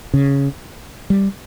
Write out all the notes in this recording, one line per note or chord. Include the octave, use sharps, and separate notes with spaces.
C#3
G3